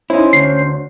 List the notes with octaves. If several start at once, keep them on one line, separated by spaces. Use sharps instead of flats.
C#4 D#4 E4 C5
D2 C7